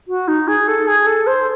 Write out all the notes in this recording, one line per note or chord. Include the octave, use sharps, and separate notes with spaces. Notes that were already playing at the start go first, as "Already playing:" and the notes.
F#4
D#4
G#4
A4
G#4
A4
C5